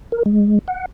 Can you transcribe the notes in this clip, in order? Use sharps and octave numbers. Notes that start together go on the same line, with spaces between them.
A#4
G#3
F#5